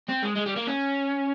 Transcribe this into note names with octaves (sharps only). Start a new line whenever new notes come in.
C4
G#3
G#3
G3
A#3
C#4